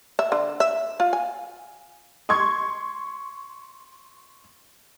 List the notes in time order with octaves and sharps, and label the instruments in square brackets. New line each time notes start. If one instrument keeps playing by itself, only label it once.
[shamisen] E5
D3
E5
F4
G#5
[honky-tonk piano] C6 C#6 G#6